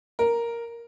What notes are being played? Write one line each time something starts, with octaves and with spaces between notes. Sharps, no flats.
A#4